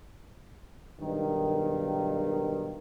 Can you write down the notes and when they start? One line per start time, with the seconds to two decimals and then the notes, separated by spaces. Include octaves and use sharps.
1.01 B1 G2 D#3